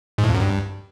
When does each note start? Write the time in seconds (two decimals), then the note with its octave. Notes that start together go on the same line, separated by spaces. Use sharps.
0.18 G#2
0.24 A2
0.29 F2
0.35 F#2
0.40 G2